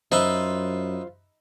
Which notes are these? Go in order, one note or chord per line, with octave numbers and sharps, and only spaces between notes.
F#2 D#4 F4 B4 C5 E5